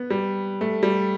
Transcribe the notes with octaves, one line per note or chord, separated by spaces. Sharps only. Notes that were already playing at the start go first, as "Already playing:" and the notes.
Already playing: B3
G3
A3
G3